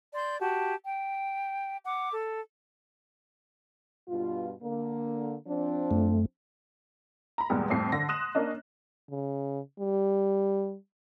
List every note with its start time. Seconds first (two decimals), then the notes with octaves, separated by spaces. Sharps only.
0.14 D5 C6 G6
0.40 F#4 G4 A5
0.85 G5
1.85 F#5 D6
2.13 A4
4.08 G2 B2 F4
4.61 D3 A#3
5.46 F3 C4 D4
5.91 F#2 A3
7.38 A#5 B5
7.50 E2 A#2 G3 G#3
7.70 F2 A2 G3 C7
7.92 D3 A#6
8.08 C6 D#6 F#6 E7
8.35 A#3 C#4 D4 D#5
9.10 C#3
9.79 G3